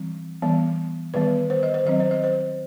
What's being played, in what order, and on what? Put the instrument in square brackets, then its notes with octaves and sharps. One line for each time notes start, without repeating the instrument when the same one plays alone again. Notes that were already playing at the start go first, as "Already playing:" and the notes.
Already playing: [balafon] E3 G3 C4
E3 G3 B3
D#3 G3 B3 B4
C5
D#5
C5
D#3 F#3 C4 D#5
C5
D#5
C5